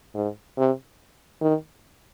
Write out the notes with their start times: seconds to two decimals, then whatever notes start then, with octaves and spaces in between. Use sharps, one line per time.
0.15 G#2
0.58 C3
1.41 D#3